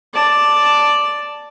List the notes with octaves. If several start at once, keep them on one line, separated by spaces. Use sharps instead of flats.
D5 A5